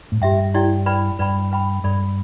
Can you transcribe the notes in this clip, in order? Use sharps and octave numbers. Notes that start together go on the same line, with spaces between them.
A2
G2 G4 E5 G5
E4 G4 D5 G5
B4 D5 G5 B5
G2 B4 D5 G5 B5
B4 G5 B5
G2 A4 D5 B5